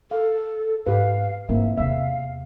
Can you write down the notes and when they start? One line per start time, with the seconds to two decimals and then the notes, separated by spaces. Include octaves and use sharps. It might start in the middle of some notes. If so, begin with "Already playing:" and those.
0.11 A4 F5
0.86 G#2 B3 G4 B4 F5
1.49 G#2 A#3 C4 E4 E5
1.77 E2 C3 E5 F5